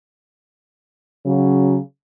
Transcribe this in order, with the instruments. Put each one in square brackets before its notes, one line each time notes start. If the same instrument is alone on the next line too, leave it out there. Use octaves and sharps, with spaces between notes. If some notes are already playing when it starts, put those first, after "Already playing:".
[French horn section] C#3 F#3